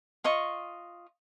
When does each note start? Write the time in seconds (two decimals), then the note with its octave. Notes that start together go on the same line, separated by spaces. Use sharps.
0.24 F4 D#5 C#6